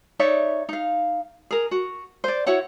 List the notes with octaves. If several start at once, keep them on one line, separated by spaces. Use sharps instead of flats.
D#4 C#5 D5 E5
D#4 F5
G#4 A#4
F#4
C5 D5
E4 F#4 C#5 F#5